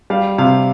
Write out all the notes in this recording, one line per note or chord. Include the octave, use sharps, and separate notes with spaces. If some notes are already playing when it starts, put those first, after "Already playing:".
G3 F5
C3 F5